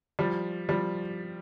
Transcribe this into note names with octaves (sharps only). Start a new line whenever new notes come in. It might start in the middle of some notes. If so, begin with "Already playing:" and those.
F3 G3
F3 G3